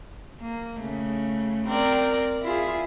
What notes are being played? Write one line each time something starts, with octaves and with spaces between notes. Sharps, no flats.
A#3
C#3 A3
C4 A#4 D5
E4 F4 G#4